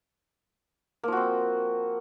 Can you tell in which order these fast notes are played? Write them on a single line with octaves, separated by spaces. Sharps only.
A#3 F3 F#4 C4